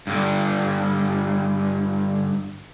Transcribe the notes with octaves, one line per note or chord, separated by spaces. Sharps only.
G2 D3